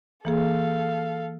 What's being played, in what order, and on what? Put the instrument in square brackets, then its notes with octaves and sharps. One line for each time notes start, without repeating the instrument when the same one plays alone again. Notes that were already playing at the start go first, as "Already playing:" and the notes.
[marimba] E3 A#3 G#4 [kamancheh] A4 F5